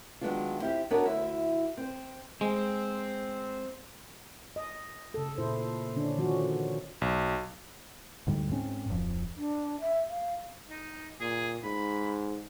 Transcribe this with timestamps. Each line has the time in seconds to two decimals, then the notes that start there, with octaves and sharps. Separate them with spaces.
0.21 D#3 F#3 G#3 B3 D4 F4
0.60 C4 E4 F4 G4
0.91 B3 D4 F#4 A#4 C#5 D#5
1.05 D2 E4
1.77 C4 C5
2.41 G#3 C4
4.56 D#5
5.14 C#3 A4
5.38 A#2 E4 C5
5.96 D3 C#4 D4
6.17 D#3 F3 C#4 F#4
7.02 B1
8.27 D2 G#2 D3 G3
8.51 G#2 C4 C#4
8.89 D1 F2 F3
9.37 D4
9.81 E5
10.09 F5
10.69 D#4
11.20 A#2 G#4
11.64 G#2 B5